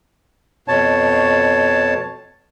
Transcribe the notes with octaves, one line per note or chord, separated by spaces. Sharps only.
F2 B2 C#5 A5